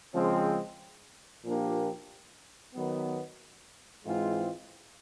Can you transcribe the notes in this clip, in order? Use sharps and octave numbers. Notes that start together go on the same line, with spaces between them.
C#3 F3 G#3 C4
A#2 F3 A#3 D4 G4
D#3 F#3 B3
G#2 E3 G#3 C4 F4